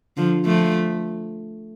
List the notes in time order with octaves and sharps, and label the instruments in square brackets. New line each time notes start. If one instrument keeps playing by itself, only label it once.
[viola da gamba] D3 F3
F3 A3